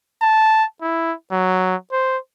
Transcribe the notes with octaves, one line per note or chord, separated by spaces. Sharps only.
A5
E4
F#3
C5